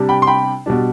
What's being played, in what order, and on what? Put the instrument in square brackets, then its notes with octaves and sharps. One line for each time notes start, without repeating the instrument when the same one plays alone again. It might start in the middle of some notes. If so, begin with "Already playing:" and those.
Already playing: [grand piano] C3 G3 D4
G5 B5
C6
G5 B5
B2 G3 D4